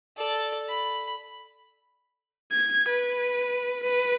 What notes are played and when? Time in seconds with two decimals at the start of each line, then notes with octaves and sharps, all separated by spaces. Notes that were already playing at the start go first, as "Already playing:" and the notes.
0.17 A4 D5
0.69 B5
2.52 G#6
2.88 B4
3.84 B4